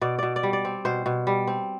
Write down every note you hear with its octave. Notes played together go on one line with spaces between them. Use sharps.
B2 D5
B2 D5
D5
G3
D5
C4
B2 C5
B2
G3
C4